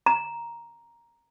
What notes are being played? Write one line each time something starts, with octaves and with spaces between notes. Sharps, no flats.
A#5